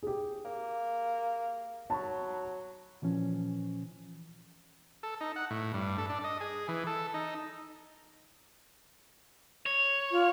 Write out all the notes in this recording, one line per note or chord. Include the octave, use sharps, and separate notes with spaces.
G4 G#4
A#3
F#3 A5 B5 C#6
A#2 E3 F3 C#4
A4
D#4
F#5
A2
G2
A4
D4
D#5
G#4
E3
A4
D#4
C#5
F4